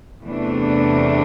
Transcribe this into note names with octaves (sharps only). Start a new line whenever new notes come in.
E2 C3 E3 A3 D4